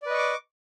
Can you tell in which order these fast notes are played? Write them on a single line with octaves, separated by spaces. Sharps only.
D5 B4 D#5 C#6 D6